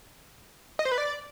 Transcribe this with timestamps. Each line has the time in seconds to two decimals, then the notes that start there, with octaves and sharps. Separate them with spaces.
0.79 D#5
0.85 C5
0.92 B4
0.98 D5